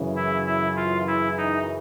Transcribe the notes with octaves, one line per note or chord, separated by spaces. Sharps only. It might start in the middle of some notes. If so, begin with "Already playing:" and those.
Already playing: F#2 C#3 E3
E4
E4
F4
E4
D#4